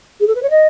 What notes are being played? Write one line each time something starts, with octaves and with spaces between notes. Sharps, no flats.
G#4
A4
B4
C#5
D#5